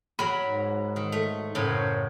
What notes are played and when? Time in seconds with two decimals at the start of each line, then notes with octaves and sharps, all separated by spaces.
0.19 F#3 A#4 B5
0.43 G#2
0.96 D#3
1.12 A3
1.55 F#2 A2 C#3 A#4 C5 C#5